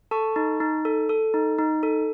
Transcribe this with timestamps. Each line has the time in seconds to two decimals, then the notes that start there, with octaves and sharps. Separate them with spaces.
0.11 A4 A5 C#6
0.36 D#4
0.60 D#4
0.85 A4
1.09 A4
1.34 D#4
1.59 D#4
1.83 A4